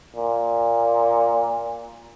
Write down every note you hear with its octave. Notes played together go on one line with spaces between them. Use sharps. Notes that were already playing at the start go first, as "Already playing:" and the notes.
A#2